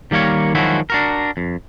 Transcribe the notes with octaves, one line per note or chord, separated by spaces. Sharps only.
D#3 G3 A#3 A#4 C#5
D#3 F3 F#3 G#3 E4 F#4
D4 F#4 A#4
F2